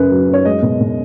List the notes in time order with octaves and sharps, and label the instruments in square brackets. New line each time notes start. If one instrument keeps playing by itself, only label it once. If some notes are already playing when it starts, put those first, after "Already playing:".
Already playing: [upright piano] F#2 C#3 B4
F#3
F#2 C#5
G#3 D#5
B2
B2